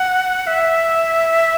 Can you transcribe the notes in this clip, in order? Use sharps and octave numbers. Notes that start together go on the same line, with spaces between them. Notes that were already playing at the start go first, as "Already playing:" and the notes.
Already playing: F#5
E5